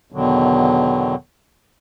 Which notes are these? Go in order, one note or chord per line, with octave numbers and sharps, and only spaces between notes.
E2 B2 D3 D#3 F#3